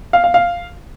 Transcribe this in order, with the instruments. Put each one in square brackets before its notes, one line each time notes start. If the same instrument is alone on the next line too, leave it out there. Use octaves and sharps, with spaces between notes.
[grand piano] F5
F5
F5